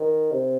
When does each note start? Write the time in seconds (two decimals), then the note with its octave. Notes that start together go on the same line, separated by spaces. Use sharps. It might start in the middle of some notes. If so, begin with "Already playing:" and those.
Already playing: D#3
0.31 C3